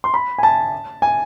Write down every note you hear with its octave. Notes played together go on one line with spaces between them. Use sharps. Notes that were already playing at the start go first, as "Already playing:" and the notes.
C6
B5
G#5
A5
G#5